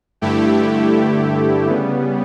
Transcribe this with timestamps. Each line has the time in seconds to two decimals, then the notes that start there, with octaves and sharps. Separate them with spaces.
0.21 G2 D3 A3 E4 G4
1.68 C#3 G3 B3